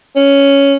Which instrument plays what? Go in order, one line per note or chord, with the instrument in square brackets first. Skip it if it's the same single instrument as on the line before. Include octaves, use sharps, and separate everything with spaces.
[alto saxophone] C#4